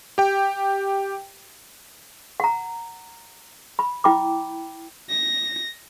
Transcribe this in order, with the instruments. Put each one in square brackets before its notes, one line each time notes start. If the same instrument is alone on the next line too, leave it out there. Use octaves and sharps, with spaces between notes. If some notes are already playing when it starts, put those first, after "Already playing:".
[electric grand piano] G4 G5
[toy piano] F#5 A#5
B5
E4 G5 B5 D6
[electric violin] A#6